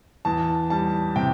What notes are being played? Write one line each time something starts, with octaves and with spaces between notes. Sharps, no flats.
E2 A5
G3 A5
C3 G5